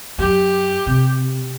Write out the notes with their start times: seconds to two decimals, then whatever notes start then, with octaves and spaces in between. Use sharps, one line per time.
0.18 F#2 G4
0.87 C3